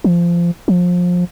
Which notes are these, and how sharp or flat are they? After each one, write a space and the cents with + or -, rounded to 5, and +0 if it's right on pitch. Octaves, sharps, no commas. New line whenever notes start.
F3 -20
F3 +25